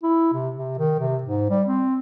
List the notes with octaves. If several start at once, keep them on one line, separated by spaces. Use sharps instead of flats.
E4
C3
C3
D#3
C3
G#2
G3
C4